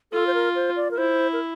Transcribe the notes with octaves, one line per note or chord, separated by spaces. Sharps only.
F4 A4
C5
A#4
C5
D5
A#4
E4 C5
A#4